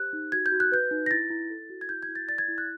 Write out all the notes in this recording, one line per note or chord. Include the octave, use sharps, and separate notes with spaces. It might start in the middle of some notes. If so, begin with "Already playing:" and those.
Already playing: G4 C5 F#6
D#4
F#4 G#6
G6
F#4
F#6
B4 G6
D#4
A#6
E4 A6
E4
A4
F#4
G#6
E4 G6
G#6
E4
A6
D5 A6
G#6
E4
F#6